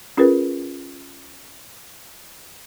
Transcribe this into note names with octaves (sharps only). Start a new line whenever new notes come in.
C#4 F4 G#4 A#4 B4